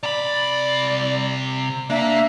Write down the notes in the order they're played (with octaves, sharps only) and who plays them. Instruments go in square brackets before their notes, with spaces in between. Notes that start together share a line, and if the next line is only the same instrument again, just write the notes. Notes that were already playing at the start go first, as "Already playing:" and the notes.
[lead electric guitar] C3 B5 [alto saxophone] D5
[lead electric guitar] A#3 [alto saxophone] D4 [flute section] E5